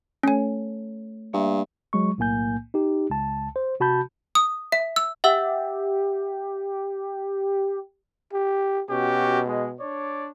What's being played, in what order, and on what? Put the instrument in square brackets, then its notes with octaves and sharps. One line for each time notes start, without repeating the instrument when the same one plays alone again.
[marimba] A3 A4 C#5 [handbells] C#4 G#5
[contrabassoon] G2 [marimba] A#3 E5
[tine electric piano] F#3 G#3 C#6
B1 A2 A#3 G#5 G6
D#4 G4
C#2 A5
C5
C3 F#4 A5 B5 G6
[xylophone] D#6
E5
E6
[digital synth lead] G4 [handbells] E5 F#5 E6
[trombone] G4
[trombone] B2 [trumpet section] C#4 F#4 G4
[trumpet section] G#3
D4 C#5 D5